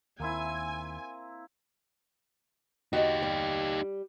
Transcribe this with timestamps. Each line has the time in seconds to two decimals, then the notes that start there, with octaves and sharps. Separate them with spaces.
0.20 D#2 A#3 C4 E4 G#5
2.93 D#4 F#4 G4 D#5
3.22 G3